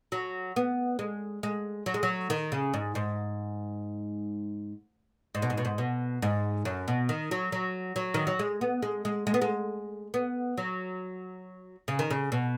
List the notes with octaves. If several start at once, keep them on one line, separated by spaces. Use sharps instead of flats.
F#3
B3
G#3
G#3
F#3
G#3
F#3
D#3
C#3
G#2
G#2
G#2
B2
G#2
B2
G#2
B2
G#2
F#2
B2
D#3
F#3
F#3
F#3
D#3
F#3
G#3
B3
G#3
G#3
G#3
B3
G#3
B3
F#3
C#3
D#3
C#3
B2